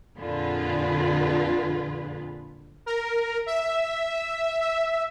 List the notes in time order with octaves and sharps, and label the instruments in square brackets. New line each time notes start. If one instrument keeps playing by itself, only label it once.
[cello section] F2 A#2 D3 F4 G#4 B4
[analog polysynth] A#4
E5